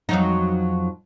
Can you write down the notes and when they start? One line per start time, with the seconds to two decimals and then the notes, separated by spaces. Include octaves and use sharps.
0.09 F2 F#3 D#4